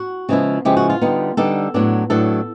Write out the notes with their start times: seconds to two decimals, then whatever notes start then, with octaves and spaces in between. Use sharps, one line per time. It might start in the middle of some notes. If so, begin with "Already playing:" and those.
Already playing: F#4
0.29 C#3 F3 G#3 B3 E4
0.65 C#3 F3 G#3 B3 E4 G4
0.77 F#4
0.90 F4
1.02 D3 G3 B3 D#4
1.37 D3 G3 B3 D#4 A4
1.74 A2 F#3 B3 D4
2.10 A2 F#3 B3 D4 A4